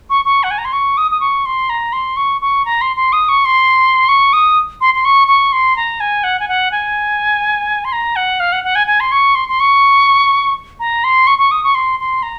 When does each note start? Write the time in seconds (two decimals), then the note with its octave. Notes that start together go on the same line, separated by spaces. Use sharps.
0.10 C#6
0.25 C#6
0.43 F#5
0.51 G#5
0.58 A#5
0.65 C6
0.73 C#6
0.98 D#6
1.11 D#6
1.21 C#6
1.46 C6
1.70 A#5
1.93 C6
2.17 C#6
2.41 C#6
2.65 A#5
2.81 C6
2.97 C6
3.13 D#6
3.29 C#6
3.45 C6
4.09 C#6
4.33 D#6
4.81 C6
4.94 C6
5.05 C#6
5.28 C#6
5.53 C6
5.76 A#5
6.00 G#5
6.24 F#5
6.40 G#5
6.48 F#5
6.72 G#5
7.85 C6
7.92 A#5
8.16 F#5
8.40 F5
8.52 F#5
8.64 F#5
8.75 G#5
8.87 G#5
9.00 C6
9.12 C#6
9.35 C6
9.49 C6
9.60 C#6
10.80 A#5
11.04 C6
11.27 C#6
11.39 C#6
11.51 D#6
11.64 C#6
11.75 C6
12.00 C6
12.23 A#5